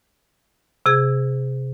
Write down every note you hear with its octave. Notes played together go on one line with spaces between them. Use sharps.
C3 G#4 G#6